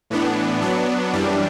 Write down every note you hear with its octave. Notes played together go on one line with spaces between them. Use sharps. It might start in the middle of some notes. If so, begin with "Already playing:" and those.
A2 E3 B3 D4
F#3 B3 D4
F#2 E3 G3 D4